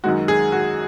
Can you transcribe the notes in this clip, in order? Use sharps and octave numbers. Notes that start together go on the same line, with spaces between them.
F#2 D#3 G#3 F#4
G#4
F#4